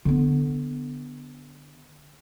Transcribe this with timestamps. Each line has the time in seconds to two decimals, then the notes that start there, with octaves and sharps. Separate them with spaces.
0.05 D3 B3